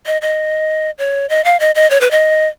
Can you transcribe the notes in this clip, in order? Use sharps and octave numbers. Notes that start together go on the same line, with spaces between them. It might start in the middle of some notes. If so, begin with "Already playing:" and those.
D#5
D#5
C#5
D#5
F5
D#5
D#5
C#5
B4
D#5